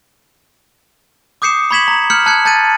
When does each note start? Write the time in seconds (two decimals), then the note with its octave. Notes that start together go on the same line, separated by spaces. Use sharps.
1.42 D6 D#6 G6 C7 C#7 E7
1.71 B5 C#6 G#6 B6 E7 F#7
1.88 A#5
2.10 F6 G6 C#7 F#7
2.26 A5 F#6 G#6 C#7
2.45 A5 G6 A6 D#7